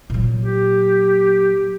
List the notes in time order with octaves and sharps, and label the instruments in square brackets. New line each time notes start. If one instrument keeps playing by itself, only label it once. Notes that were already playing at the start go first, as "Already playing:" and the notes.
[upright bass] A#2 F#3
[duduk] G4